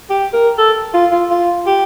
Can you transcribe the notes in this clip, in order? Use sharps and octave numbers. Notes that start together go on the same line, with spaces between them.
G4
A#4
A4
F4
F4
F4
G4